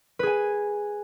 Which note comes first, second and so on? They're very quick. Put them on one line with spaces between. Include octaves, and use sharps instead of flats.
B4 G#4 G#5